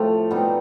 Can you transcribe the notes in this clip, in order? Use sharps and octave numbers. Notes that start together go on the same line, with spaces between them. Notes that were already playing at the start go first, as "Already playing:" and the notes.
Already playing: A2 C3 F3 A3
B2 G3 C4 D#4